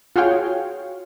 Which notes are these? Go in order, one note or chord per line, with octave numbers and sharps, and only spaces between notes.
F4 F#4 G#4 C#5 F5 G5